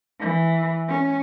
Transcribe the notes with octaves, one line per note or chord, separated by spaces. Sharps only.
E3
C#4